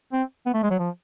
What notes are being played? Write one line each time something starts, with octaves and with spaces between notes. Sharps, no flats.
C4
B3
A3
G#3
F#3
F3